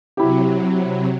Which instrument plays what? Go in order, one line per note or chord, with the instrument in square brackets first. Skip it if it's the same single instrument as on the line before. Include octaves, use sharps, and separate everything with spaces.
[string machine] C3 F#3 [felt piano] E4 G4